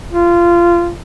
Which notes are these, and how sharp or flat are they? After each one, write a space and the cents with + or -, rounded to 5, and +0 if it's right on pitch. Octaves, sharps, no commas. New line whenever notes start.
F4 -20